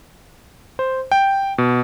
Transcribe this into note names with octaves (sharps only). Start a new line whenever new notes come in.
C5
G5
B2